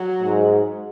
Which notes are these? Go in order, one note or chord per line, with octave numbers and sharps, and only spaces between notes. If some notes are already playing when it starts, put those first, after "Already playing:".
Already playing: F#3
G#2